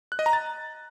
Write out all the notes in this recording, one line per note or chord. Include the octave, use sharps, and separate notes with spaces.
F#6
D#5
A#5
A6